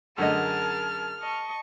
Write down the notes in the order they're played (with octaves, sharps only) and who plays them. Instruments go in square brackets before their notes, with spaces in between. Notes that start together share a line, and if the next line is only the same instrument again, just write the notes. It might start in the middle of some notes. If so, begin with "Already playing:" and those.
[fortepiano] F#2 D3 D#5 [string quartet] G#4 A#4 A5 [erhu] F6
[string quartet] D#5 A5 C#6